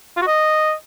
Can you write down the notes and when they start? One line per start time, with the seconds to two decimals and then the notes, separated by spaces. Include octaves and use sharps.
0.17 F4
0.22 F#4
0.27 D#5